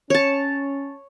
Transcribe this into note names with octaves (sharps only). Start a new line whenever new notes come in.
C#4 C#5 A5